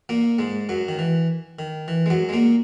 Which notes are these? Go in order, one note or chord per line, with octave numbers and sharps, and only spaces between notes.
A#2 A#3
G#2 G#3
F#2 F#3
D#3
E3
D#3
E3
G#3
F#2 F#3
G#3
A#2 A#3